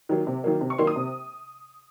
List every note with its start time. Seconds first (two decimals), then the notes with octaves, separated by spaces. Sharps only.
0.09 D#3 F#3 A#3
0.27 C3
0.44 D#3 F#3 A#3
0.61 C3
0.70 C#6
0.78 D#3 F#3 A#3 C6
0.87 D#6
0.96 C3